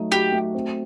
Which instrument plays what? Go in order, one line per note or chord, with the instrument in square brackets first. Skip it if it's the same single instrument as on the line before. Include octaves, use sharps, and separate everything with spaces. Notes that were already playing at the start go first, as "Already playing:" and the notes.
Already playing: [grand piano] F#3 A3 D#4
[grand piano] F#4 [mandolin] G4
[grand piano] A3
C4